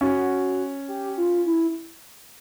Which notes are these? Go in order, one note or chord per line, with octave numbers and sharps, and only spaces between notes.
C#4 F#4
G4
F4
E4